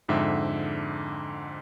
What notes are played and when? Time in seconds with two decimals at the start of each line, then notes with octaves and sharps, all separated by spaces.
0.08 F2 G#2 D3 E5 G5